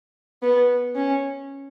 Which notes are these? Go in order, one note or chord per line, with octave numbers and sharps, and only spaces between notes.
B3
C#4